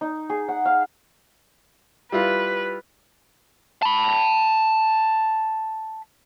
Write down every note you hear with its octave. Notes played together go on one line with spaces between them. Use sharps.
D#4
G#4
F#5
F5
G3 E4 F4 B4
A5 B5